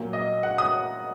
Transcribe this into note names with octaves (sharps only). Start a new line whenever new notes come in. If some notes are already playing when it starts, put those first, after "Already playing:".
Already playing: A#2 F#3 A#3
D#5
F#5
D#6